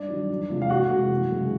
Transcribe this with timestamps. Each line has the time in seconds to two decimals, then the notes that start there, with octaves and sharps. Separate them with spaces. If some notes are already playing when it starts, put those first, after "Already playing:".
Already playing: G2 D4 D5
0.08 D#3 F#3
0.29 E2
0.49 C3 F3 G#3
0.62 F5
0.70 F2 F#4 F#5
0.90 C3 E3 G#3
1.11 F#2
1.31 C#3 E3 G#3